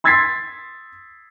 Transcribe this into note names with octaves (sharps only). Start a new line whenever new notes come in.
C6 E6 G#6 A6 B6 C7